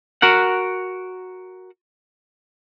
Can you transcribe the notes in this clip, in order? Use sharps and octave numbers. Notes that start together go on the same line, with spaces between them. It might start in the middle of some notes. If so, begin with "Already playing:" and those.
F#4 A#4 F#5